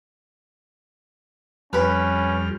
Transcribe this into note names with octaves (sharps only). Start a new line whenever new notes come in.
F2 G3 C#4 B4 B5 F6